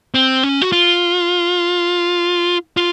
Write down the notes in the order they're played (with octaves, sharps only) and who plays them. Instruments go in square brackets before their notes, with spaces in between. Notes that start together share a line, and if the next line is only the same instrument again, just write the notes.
[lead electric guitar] C4
C#4
F#4
F4
F4